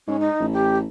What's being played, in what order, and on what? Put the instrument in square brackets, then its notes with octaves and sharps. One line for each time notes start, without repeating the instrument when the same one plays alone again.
[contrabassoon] G#2 [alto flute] C#4
[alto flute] D#4
[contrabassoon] A1
[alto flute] G4